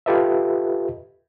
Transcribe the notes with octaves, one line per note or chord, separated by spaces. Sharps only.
F4 G4 A4 B4 D#5 E5